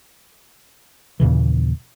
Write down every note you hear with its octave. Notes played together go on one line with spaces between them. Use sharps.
D#2 A#2 C#3 E3